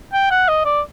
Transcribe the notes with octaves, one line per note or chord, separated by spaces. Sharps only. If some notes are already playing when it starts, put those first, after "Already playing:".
G5
F#5
D#5
D5